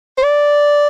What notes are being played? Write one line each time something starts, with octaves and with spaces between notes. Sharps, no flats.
C5
D5